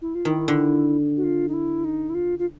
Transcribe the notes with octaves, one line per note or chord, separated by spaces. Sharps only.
E4
F4
D#3 E4
D3
F#4
F4
D#4
E4
D#4
E4
F4
F4